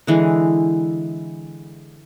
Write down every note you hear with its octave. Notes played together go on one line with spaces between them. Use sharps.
D3 E3 G#3